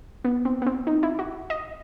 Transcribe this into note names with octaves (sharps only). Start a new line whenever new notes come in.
B3
C4
B3
C4
D#4
E4
F#4
D#5